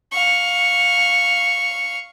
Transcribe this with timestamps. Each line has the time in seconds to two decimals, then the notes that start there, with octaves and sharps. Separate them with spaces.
0.12 F5 C#6